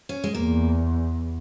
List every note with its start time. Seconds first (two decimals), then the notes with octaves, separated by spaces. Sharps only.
0.09 C#4
0.24 G#3
0.34 E2 A#3